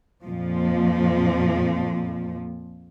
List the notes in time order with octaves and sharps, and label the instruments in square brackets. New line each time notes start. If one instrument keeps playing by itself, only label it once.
[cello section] F2 A#2 F3